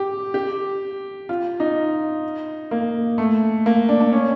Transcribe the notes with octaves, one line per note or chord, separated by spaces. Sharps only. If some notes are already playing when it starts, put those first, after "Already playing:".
Already playing: G4
G4
F4
D#4
A#3
A3
A#3
D4
D4
C#4